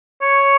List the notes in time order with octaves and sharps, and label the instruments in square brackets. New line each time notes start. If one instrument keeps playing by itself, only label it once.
[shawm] C#5